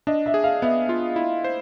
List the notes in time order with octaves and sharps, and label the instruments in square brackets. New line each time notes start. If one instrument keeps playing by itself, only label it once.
[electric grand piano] D4 [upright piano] D#5
[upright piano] E5
[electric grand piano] G#4
[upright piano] F5
[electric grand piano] B3 [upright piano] E5
[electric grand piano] F4
E4
C5